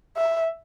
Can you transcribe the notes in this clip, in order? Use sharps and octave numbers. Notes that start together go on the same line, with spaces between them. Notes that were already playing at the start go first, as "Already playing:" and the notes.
E5